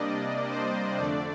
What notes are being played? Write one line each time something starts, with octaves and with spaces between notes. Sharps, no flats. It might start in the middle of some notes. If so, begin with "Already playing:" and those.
Already playing: C3 G3 A#3 D4 D5 D#5
C5
F2 D3 A3 D4 D5